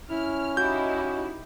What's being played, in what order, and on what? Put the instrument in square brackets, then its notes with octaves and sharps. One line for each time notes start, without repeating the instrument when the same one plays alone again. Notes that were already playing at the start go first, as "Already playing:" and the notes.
[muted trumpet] C#4 [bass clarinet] E4 [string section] F6
[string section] D#4 E4 G4 [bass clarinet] F#4 [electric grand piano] G6